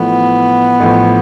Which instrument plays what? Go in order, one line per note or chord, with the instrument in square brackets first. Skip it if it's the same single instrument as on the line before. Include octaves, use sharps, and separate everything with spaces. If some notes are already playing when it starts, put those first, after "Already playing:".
Already playing: [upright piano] A1 A2 F3 [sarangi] B3
[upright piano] A1 A2 F3